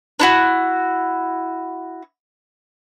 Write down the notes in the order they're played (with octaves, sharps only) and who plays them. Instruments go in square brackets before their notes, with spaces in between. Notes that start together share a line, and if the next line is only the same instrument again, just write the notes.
[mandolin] D4 E4 F#4